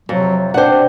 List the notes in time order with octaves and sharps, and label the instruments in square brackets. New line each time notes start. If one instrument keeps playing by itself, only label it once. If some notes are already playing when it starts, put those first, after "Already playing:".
[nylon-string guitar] F2 [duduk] C3 [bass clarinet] F#3
[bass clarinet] D4 [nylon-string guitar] C5 F#5 [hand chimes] D5 G5